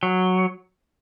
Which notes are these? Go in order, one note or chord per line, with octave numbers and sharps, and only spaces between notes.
F#3